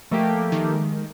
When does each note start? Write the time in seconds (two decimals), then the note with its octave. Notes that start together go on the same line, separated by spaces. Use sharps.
0.11 F3 A3 A#3 G4 D#5
0.52 D#3
0.74 G#3